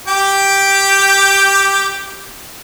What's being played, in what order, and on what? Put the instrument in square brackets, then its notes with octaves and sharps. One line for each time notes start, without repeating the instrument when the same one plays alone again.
[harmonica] G4 G5 D6